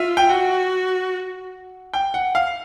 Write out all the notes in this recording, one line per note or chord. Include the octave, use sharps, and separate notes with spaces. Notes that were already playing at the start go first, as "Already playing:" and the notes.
Already playing: F4 E5
G5
F#4 F#5
G5
F#5
F5